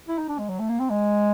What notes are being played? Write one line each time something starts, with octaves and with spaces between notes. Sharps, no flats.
E4
D#4
D4
G#3
F#3
A3
A#3
C4
G#3